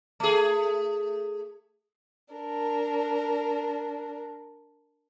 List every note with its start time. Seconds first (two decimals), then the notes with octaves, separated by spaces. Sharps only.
0.20 A3 G#4
2.34 D4 A#4